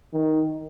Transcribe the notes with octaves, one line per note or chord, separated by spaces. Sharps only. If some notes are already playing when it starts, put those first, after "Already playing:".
D#3